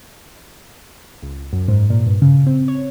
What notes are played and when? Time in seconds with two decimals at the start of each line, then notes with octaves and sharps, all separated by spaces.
1.22 C#2
1.53 F#2
1.68 G#2
1.90 A#2
2.06 G2
2.22 C#3
2.46 C4
2.68 C#5